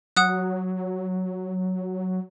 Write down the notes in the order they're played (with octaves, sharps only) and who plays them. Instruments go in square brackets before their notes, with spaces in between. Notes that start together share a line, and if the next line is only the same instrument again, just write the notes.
[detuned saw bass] F#3 [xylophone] F#5 D#6 F#6